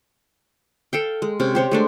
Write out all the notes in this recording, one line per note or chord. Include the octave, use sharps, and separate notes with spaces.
A4 F5 G5
G#3
C3 C#4
G4 C5 C#5
G#3 A3 D4